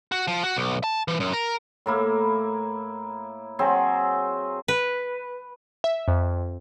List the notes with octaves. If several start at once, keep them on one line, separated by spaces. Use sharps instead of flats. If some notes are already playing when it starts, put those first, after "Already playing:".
F#4
F3
F#4
B1
A5
E3
F#2
A#4
A2 A#3 E4
F#3 C4 G#4 C5
B4
E5
F2